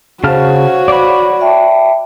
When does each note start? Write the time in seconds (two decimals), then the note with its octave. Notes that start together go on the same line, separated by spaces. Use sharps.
0.24 C#3 F#4 C5 C#5 F5 A5 F6
0.88 D5 B5
1.41 E5 G5 A5